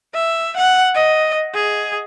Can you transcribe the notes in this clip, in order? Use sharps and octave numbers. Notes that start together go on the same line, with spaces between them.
E5
F#5
D#5
G#4